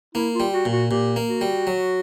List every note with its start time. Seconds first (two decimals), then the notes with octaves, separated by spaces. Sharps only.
0.15 A#3 E4
0.35 F4
0.40 G3
0.53 F#4
0.65 A#2
0.72 F#4
0.91 A#2 G4
1.16 A#3
1.29 F#4
1.41 G3
1.67 F#3